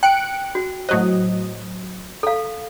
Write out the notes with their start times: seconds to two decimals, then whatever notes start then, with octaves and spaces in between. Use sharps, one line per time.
0.03 G5 F#6 C#7 D7
0.55 F#4
0.89 A2 F#3 C5 D#5
2.23 A4 F5